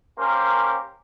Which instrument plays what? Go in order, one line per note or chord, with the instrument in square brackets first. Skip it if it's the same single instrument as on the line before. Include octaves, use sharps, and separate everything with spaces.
[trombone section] A#3 C#4 G4 A#4 C5